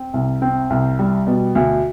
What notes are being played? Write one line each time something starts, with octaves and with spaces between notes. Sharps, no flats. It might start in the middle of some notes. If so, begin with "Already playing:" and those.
Already playing: C4
C2
C4
C2
G3
B2
D2